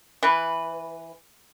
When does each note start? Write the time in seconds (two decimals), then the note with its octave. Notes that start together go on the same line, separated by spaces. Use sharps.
0.23 E3 B4